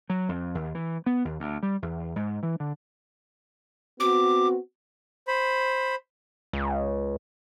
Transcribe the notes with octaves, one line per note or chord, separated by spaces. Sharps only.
F#3
F2
D#2
E3
B3
D#2
D2
G3
E2
G#2
E3
D3
B3 C4 F#4 D6
C5 B5
C#2